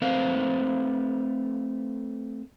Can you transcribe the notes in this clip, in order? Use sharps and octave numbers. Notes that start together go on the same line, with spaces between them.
A3 C4 A4 B4 C5 F5